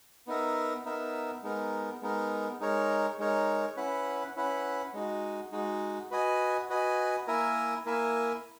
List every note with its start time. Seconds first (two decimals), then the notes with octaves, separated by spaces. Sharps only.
0.27 B3 D#4 A#4 E5
0.85 B3 D#4 A#4 E5
1.43 G#3 B3 D#4 A#4
2.01 G#3 B3 D#4 A#4
2.60 G#3 D#4 A#4 C#5
3.19 G#3 D#4 A#4 C#5
3.77 C#4 E4 B4 F#5
4.36 C#4 E4 B4 F#5
4.94 G#3 D#4 F#4
5.52 G#3 D#4 F#4
6.11 F#4 B4 D#5 G#5
6.70 F#4 B4 D#5 G#5
7.27 A#3 E4 A#4 E5 G#5
7.86 A#3 E4 A#4 E5 G#5